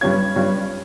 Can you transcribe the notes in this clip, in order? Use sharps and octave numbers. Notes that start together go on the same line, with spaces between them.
G2 G3 C#4 F4 G#6
G2 G3 C#4 F4